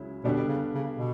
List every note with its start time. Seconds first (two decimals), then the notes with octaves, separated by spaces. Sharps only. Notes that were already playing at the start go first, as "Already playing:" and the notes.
Already playing: C#2 C#3 F#3 C#4 E4
0.24 B2 D3 G3 B3 D4 G4
0.49 C#3
0.74 C#3
0.98 B2